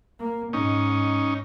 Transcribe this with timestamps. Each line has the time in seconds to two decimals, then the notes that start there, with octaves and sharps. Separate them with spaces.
0.20 A#3
0.53 G#2 C#4 D#4